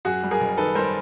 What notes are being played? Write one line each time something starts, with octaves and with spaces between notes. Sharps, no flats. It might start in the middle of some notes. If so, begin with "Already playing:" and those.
F#2 F#4 G#4
G3
G#4 A#4
F#1
D#3 A4 B4
G3 A#4 C5